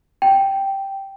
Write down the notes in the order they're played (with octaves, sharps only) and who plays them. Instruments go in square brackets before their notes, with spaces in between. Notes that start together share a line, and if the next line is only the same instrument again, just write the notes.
[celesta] G5